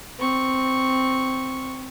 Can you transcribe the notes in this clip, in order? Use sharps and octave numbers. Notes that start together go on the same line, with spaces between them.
C4 C#6